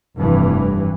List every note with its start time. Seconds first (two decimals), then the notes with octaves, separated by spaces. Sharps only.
0.17 F1 G2 E3